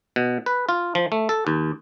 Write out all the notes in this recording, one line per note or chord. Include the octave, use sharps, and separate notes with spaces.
B2
B4
F4
F3
A3
A4
D#2